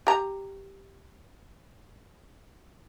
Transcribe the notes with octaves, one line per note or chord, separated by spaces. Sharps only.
G4 A#5